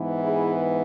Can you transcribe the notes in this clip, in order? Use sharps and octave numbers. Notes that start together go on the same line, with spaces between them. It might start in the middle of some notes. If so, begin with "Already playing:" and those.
Already playing: G#2 E3 B3
E4 G#4